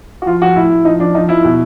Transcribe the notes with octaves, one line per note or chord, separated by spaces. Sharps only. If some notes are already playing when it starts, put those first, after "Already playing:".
F#4
F3 F4
F3 F#4
A2 E4
A2
F3 D#4
F3 D4
F3 D#4
F3 E4
B2